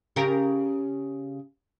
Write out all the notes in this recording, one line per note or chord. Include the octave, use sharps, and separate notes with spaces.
C#3 G4 A#4